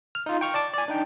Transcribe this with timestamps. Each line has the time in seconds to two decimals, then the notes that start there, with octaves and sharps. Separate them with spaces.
0.15 F6
0.26 D#4 F4
0.41 G5 C#6 F6
0.54 D5 A5 D6
0.74 D5 G#5
0.88 D4 D#4 G5